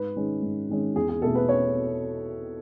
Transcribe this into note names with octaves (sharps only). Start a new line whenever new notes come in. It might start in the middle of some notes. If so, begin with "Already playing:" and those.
Already playing: G#2 B4
D#3 G#3 C#4
G#2
D#3 G#3 C#4
E2 G#4
G#4
B2 A3 A4
B4
C#5